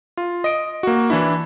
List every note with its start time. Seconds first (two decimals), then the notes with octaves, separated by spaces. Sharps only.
0.17 F4
0.44 D#5 D7
0.83 A#3 F#4
1.10 E3 D4 E4